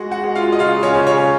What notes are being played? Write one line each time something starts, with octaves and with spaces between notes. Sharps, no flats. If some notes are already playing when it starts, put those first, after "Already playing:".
Already playing: G#3 F#4 F#5
F#4 F#5
G#3
F4 F5
D#5
C#3 F4 F5
C#4 C#5
C#3
C#4 C#5